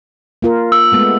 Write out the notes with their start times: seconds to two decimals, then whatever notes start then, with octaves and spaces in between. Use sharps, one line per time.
0.42 A#3 F4 A#4
0.72 E6
0.92 G#3 A3 B3